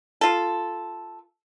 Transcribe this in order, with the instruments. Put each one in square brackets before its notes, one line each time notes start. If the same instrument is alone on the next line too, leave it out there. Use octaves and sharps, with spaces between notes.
[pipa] F4 A4